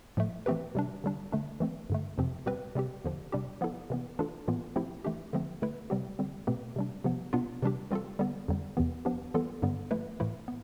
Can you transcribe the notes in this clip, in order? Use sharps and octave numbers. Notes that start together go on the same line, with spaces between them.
A2 F3 A3
E3 A3 C4 G4 B4
C3 G3 D4
D3 G3 D4
D3 A3 D4
E3 A3 C4
G2 D3 A3
F2 C3 F3 C4
B2 G3 C4 G4 B4
C3 G3 C4 G4
E2 D3 F3
C3 G3 D4 G4
F3 B3 E4 A4
C3 E3 B3
E3 A3 D4 F4 A4
A2 E3 B3 F4
F3 A3 C4 E4 G4
E3 A3 D4 G4
D3 F3 A3 C4
D3 A3 E4 B4
C3 G3 C4 G4
D3 G3 C4
B2 A3 C4 G4 B4
C3 G3 D4
C3 F3 B3
B2 B3 D4 F4
C3 E3 G3 D4 G4
E3 G3 C4 F4 A4
D3 G3 B3
F2 D3 G3 C4
E2 C3 E3 B3
F3 B3 D4 G4
E3 G3 B3 F4 A4
G2 D3 G3 B3
F3 A3 E4 B4
A2 E3 A3 E4
B3